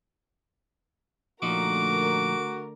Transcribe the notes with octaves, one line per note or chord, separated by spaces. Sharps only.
A#2 D3 F3 A3 D#4 F#4 A#4 D6